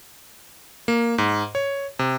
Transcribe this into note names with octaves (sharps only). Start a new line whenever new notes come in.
A#3
G#2
C#5
C3